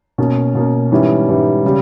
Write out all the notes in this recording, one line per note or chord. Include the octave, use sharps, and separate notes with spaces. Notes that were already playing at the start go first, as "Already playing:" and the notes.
B2 A#3 C#4
B2 A#3 C#4
G#2 E3 G3 C#4 E4
G#2 E3 G3 C#4 E4
C#3 G3